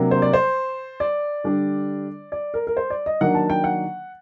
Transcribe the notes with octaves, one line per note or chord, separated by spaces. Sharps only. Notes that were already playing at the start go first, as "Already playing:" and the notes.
Already playing: C3 F#3 A#3 D4
C5
D5
C5
D5
D3 G3 D4
D5
A#4
A#4
C5
D5
D#5
D#3 F#3 A#3 D4 F#5
A5
G5
F#5